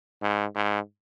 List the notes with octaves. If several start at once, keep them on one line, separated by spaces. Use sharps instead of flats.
G#2
G#2